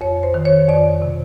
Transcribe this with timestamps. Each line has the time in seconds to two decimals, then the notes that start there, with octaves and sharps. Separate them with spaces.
0.01 F2 C#5
0.23 C5
0.34 D#3
0.45 C#5
0.68 F2 D5
1.02 C3